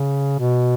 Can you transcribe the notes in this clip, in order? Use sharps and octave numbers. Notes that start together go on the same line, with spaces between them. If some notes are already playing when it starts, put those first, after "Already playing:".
Already playing: C#3
B2